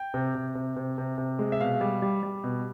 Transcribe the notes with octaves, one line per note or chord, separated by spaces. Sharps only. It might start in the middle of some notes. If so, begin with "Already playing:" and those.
Already playing: G5
C3
C3
C3
C3
C3
C3
G#3
E5
B2 F5
G3
G3
G3
B2